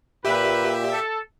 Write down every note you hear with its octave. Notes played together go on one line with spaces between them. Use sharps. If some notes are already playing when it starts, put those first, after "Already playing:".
A#2 G4 B4 E5
A4